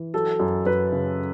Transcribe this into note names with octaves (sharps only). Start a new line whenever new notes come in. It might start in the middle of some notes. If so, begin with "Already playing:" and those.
Already playing: E3
F#3 A4
F#2
F#2 B4
C#3